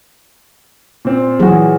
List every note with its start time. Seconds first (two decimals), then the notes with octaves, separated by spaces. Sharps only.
1.05 A#2 C4
1.39 A#2 E3 F#3 F#4 G#4